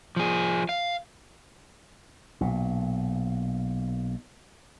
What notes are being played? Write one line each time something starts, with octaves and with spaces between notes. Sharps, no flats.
F3 G#4
F5
B1 A#2